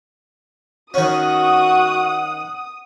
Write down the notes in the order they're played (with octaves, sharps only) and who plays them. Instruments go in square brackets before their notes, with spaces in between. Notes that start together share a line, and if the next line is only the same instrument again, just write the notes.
[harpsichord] D#3 C#4 [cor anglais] F#4 [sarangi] F#5 [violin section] D#6